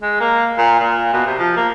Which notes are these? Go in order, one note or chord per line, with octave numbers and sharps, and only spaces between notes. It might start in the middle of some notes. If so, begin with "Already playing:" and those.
G#3
A#3
A#2
A#2
B2
C3
F3
A#3